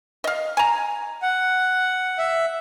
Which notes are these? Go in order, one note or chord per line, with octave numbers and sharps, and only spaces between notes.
D#5 F5
G#5 A#5
F#5
E5